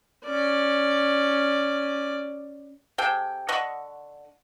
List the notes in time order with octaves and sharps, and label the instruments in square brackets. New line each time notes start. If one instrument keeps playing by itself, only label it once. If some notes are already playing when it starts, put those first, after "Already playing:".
[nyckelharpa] C#4 D5
[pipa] C3 G#4 A4 G5
D3 D#5 F#5 C#6